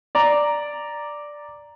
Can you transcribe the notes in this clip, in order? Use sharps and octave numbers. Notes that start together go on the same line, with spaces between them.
D5 A#5